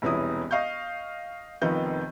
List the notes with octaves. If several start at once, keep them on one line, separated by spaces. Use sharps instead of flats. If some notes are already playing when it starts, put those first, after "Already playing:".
E1 C2 B3 C#4 E4 D#6
D#5 F5 C#6 G6
F1 F2 D#3 B3 F4 G6